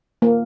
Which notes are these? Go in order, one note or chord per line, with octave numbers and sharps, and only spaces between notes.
A#3